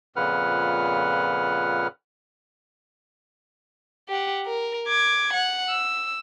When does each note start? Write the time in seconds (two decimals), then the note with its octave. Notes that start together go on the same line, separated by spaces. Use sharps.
0.16 F2 A#2 C#3 B4 F#5 F6
4.09 G4 F#5
4.46 A#4
4.88 D6 G#6
5.33 F#5
5.69 E6